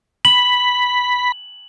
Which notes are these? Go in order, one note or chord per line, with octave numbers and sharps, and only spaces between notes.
B5 F#7